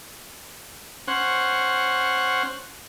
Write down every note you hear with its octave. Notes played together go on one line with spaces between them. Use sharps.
C#4 C5 F#5